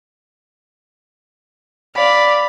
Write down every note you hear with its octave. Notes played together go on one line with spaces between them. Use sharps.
D5 F5 B5